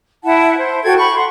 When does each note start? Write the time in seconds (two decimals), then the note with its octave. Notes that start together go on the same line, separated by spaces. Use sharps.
0.24 E4 F#5 A5
0.57 C5
0.84 F#4 A4 G5 G#6
0.98 A5 B5 C#6
1.15 F#5 C6